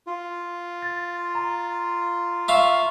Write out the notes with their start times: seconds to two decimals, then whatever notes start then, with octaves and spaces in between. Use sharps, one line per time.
0.07 F4
0.82 A6
1.35 A#5
2.48 E5 F5 C#6